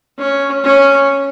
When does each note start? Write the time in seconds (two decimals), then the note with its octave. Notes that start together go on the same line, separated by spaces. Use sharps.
0.18 C#4
0.63 C#4